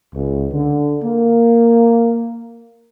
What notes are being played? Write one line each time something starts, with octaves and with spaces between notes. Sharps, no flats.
C#2
D3
A#3